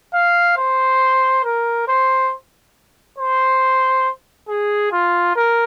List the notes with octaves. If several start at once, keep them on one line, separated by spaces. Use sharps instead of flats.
F5
C5
A#4
C5
C5
G#4
F4
A#4